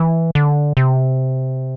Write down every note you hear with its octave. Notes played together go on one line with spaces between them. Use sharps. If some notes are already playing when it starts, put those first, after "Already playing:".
Already playing: E3
D3
C3